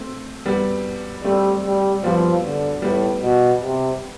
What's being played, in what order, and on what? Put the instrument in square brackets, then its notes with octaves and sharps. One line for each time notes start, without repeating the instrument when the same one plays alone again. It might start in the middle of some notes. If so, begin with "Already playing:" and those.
Already playing: [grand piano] A3 C4
G3 B3
[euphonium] G3 [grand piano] A3 C4
[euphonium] G3
[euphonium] F3 [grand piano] G3 B3
[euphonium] D3
[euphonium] A2 [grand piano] G3 B3
[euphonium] B2
C3